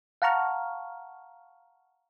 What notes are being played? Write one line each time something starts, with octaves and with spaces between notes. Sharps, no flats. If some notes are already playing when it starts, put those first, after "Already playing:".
F5 F#5 A5 A#5 C#6 F6